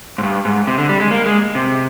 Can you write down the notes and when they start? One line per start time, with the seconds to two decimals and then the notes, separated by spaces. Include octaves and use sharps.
0.18 G#2
0.23 G2
0.45 G#2
0.67 C3
0.78 D3
0.89 G3
1.00 G#3
1.11 A#3
1.26 G#3
1.55 C3